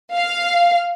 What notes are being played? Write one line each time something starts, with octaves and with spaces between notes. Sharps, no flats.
F5